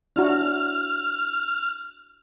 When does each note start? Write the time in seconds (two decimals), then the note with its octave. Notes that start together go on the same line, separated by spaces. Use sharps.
0.16 D4 E4 F#4 F6